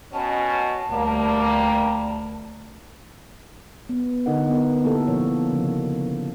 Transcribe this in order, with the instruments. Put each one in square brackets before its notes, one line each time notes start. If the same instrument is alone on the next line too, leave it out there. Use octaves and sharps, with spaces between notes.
[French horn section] B2 C#4 [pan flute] A5
[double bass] D2 [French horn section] G3 A#3
[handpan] B3
D3 D#4 A#4 F#5
B3 A#4
A#3 E4 G4 A4 A#4
B2 F3 A#3 C#5
C#3 F3